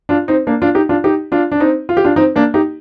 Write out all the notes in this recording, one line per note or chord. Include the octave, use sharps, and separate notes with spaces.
D4 F4
C4 D#4
A#3 D4
D4 F4
D#4 G4
D4 F4
D#4 G4
D4 F4
D4
C4 D#4
F4
G4
D4 F4
C4 D#4
A#3 D4
D#4 G4